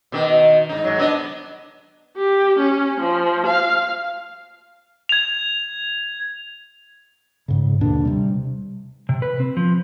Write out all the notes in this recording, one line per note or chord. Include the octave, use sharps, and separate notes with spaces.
B2 D#3
G#2 D#4
G#2 F#3
B3 D4 D#5
G4
C#4
F3
F5
G#6 F7
G#2 C#3
D#2 B2 D3 D4
C3 G3
C3
B4
C4
F3